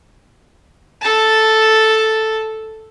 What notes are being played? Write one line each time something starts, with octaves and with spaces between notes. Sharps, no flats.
A4 A5